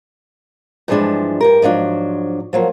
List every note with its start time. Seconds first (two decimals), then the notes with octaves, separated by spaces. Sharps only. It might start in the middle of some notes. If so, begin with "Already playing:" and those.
0.88 G2 E3 F3 G#3 D4
1.41 G2 G4 A#4
1.62 G#2 F3 F#3 D4
2.53 F3 F#3 A#3